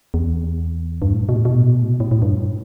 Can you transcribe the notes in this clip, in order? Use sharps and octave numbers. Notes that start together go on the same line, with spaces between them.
E2
G2
A2
B2
A2
B2
A2
B2
A2
A2
G2